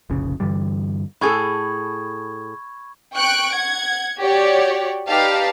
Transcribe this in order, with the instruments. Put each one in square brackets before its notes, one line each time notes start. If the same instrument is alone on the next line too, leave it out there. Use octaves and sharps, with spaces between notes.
[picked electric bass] F1 A#1 C#3
G2 D3 E3 G3
[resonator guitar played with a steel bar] A2 G#4 A4 [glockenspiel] B5 C#6 G#6
[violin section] G5 C#6 F#6 D7
F#5 G#6
F#4 G4 C#5 D5
D#4 G4 B4 D5 F5 A5